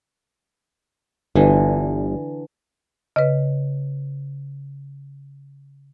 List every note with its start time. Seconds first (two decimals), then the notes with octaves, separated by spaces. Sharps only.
1.36 G1 D3 E3
3.16 C#3 B4 D#5